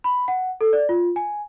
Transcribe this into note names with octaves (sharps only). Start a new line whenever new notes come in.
B5
F#5
A4
D5
F4
G#5